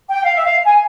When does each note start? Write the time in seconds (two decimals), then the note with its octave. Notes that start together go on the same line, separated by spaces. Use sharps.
0.09 G5
0.24 F5
0.34 E5
0.45 F5
0.65 G#5